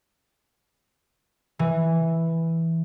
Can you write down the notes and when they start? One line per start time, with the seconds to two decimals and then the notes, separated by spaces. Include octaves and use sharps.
1.59 E3